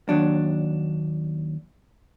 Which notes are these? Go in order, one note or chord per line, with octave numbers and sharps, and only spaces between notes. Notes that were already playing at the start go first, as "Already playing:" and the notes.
D#2 F#3 D4